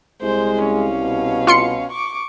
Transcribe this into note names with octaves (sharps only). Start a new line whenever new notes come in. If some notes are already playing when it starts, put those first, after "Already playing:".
C2 G#3 C5
C#4 F5
B2
F4 C6 C#7
C#6 D6